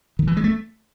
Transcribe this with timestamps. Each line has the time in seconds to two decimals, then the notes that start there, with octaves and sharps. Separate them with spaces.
0.19 D#3
0.27 E3
0.37 G#3
0.44 A3